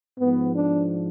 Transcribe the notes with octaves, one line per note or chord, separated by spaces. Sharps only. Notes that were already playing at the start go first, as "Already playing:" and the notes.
G#2 F3 B3
D4